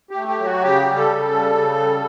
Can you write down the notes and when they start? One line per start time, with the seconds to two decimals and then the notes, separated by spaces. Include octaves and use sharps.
0.11 G4
0.16 A3
0.28 G4
0.39 F#3
0.45 F#4
0.62 C#3 G4
0.86 G3
0.98 A4
1.09 C#3
1.32 G3
1.55 C#3
1.79 G3